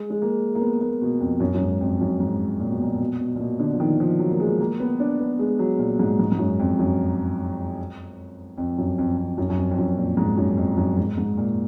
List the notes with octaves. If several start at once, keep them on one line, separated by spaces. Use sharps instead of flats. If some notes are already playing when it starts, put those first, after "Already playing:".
Already playing: G#3
G#3
A#3
A#3
B3
A#3
B2
F2
F#2
F#2
G#2
F2
F#2
G#2
A#2
B2
A#2
B2
B2
A#2
B2
D3
F3
D#3
F3
F#3
A#3
G#3
A#3
B3
D4
B3
G#3
F#3
A#2
G#2
G#2
G#2
F#2
F2
F#2
F2
F#2
F2
F2
F#2
F#2
F2
F2
F#2
A#2
G#2
F#2
F2
F#2
G#2
G#2
A#2